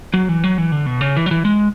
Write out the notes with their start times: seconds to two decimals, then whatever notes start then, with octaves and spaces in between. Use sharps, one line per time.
0.14 F#3
0.29 E3
0.44 F#3
0.58 E3
0.72 D3
0.86 B2
1.01 C#3
1.17 E3
1.26 F#3
1.31 E3
1.45 G#3